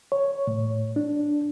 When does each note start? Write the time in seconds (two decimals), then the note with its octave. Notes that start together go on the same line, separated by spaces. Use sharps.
0.12 C#5
0.47 A2
0.96 D4